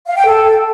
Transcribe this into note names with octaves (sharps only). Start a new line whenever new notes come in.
F5
G5
A4